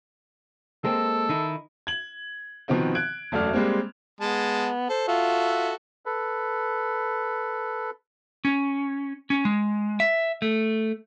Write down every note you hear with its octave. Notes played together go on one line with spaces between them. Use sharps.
G#3 A#3 C4 A4
D#3 D#4 E4
G#6 F#7
B2 D#3 F3 B3 C4 D#4
F#6 G#6 D7
E1 F#2 A3 F#4 D5 F6
G3 G#3 A#3 C4
G#3 B3 A5
A4 C5
F4 F#4 A4 E5
A4 B4
C#4
C#4
G#3
E5
A3